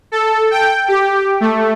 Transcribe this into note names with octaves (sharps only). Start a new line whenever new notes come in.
A4
G5
G4
A3